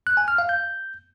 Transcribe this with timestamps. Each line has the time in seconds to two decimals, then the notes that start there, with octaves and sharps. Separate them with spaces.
0.07 F#6
0.17 G#5
0.28 F6
0.38 F5
0.49 G6